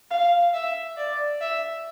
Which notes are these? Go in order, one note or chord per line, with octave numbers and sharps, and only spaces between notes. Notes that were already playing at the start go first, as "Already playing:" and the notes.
F5
E5
D5
E5